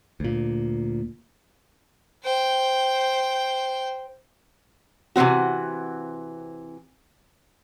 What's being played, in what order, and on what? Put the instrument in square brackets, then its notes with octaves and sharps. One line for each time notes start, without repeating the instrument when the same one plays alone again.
[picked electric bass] D2 A#2
[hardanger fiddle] C5 G5
[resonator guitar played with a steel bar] C3 E3 F3 C4 F#4